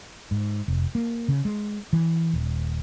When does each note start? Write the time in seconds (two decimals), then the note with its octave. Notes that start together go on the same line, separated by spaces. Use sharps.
0.31 G#2
0.68 F1
0.95 A#3
1.28 C#3
1.45 G#3
1.93 E3
2.33 D#1